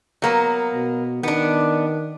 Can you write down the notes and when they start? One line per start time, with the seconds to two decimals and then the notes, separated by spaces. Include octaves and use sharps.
0.22 F#3 A#3 B3
0.74 B2
1.23 D#3 B3 D4